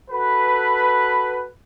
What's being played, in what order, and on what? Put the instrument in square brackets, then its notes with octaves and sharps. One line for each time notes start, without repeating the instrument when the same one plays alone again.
[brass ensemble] F#4 A4 B4